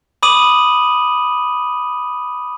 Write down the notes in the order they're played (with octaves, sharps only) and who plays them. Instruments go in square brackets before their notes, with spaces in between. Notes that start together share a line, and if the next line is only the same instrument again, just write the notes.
[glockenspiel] B5 D6 D#6 D#7 F#7